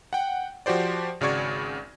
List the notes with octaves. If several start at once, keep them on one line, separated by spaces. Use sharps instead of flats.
F#5 G5
F3 F#4 G4 C5 D5
G#1 C#3 F#4 D5 C#6 G#6